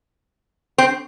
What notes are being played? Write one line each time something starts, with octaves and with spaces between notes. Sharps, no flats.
C4